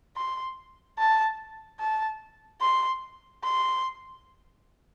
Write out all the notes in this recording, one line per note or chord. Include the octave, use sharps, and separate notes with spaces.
C6
A5
A5
C6
C6